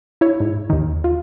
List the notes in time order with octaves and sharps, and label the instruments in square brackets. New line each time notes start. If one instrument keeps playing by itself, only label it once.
[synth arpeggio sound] E4 C#5
G#2
D#2 D#3
F4